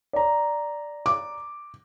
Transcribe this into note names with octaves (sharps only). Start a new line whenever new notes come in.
D5 A#5
D6